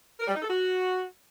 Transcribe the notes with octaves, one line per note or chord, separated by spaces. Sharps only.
A#4
G3
D#4
A4
F#4